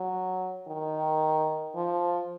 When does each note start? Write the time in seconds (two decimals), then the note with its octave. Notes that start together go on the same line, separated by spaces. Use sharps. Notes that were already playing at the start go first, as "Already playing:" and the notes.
Already playing: F#3
0.68 D#3
1.75 F3